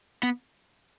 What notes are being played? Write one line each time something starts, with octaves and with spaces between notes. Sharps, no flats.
B3